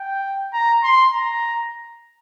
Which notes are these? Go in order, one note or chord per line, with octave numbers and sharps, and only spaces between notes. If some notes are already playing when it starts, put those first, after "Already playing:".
Already playing: G5
A#5
C6
A#5